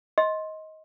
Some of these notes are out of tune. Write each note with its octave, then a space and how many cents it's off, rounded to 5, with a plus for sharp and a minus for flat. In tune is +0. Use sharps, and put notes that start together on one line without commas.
D#5 +20 C6 +15